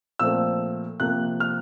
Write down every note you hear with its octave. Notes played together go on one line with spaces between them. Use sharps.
A#2 F3 A3 C4 E6
C3 F3 A#3 F#6
F6